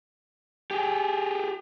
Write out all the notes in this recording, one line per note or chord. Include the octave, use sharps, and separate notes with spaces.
G4 G#4